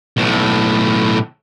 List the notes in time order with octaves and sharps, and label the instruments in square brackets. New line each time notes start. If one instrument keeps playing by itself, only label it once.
[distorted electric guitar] B1 A2